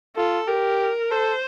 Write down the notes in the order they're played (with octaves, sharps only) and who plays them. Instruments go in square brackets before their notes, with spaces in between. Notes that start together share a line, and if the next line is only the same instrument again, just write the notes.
[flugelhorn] F4 [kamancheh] A4
[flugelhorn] G4 [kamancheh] A#4
[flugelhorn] A4 [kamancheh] C5